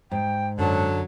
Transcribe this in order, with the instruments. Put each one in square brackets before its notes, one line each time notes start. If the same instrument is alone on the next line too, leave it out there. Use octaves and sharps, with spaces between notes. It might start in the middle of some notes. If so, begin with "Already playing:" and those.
[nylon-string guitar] G#2 [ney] G5
[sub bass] F#2 [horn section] D3 F#3 [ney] A5